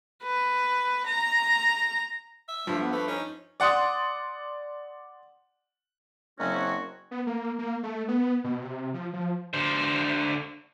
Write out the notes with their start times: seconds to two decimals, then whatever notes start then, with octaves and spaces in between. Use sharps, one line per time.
0.23 B4
1.06 A#5
2.48 E5
2.67 G2 F3 A3
2.80 B3
2.92 A3 B4
3.08 C#4 D#4
3.60 D5 F#5 C6 D#6
6.39 F#1 C4 C#4 F#4
6.55 C#5
7.11 B3
7.27 A#3
7.59 A#3
7.83 A3
8.08 B3
8.44 B2
8.62 C3
8.94 F3
9.13 F3
9.54 D3 C5